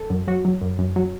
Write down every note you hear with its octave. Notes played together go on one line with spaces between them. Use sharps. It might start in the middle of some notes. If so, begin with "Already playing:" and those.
Already playing: A4
F#2
F#3 F#4
F#3
F#2
F#2
F#3